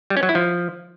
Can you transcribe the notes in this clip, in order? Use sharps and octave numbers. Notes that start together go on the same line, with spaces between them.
G3
C#4
F#3
E4
F3